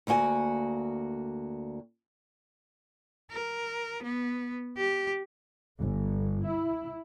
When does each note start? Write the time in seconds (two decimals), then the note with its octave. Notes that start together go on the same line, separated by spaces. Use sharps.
0.07 D2 A#3 F#4 G5 G#5
3.31 A#4
4.03 B3
4.78 G4
5.78 G1
6.46 E4